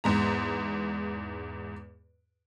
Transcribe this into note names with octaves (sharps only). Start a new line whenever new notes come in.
E2 G#2 A#5